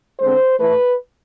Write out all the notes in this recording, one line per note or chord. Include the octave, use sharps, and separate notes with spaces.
D3 G#3 C4 C5
A2 E3 A3 B4